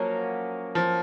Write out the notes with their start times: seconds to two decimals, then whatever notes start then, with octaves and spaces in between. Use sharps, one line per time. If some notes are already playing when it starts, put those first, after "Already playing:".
Already playing: F3 F#3 A#3 C#4
0.75 F3